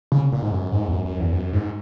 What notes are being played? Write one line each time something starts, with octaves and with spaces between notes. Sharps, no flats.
C#3
A#2
G#2
F#2
G#2
E2
F#2
F#2
E2
F#2
G#2